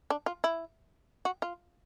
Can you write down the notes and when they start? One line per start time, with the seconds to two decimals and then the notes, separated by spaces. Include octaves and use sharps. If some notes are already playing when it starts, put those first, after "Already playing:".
0.10 D4
0.26 F4
0.44 E4
1.25 F#4
1.42 F4